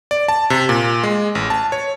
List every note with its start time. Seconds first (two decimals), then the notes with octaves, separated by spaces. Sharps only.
0.11 D5
0.28 A5
0.50 C3
0.69 A#2
1.03 G#3
1.35 A1
1.50 A5
1.72 C#5